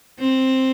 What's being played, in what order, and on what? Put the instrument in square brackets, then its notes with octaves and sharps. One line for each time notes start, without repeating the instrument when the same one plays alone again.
[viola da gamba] C4